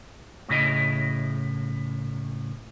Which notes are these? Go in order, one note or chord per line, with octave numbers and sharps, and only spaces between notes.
A2 C#3 E4 D#5